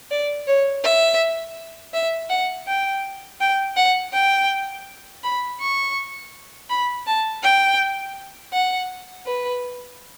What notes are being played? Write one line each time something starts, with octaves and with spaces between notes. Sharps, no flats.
D5
C#5
E5
E5
F#5
G5
G5
F#5
G5
B5
C#6
B5
A5
G5
F#5
B4